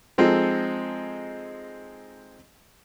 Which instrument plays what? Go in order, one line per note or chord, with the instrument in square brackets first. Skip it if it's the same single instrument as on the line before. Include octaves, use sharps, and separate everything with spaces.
[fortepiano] F3 G#3 C4 D#4 A4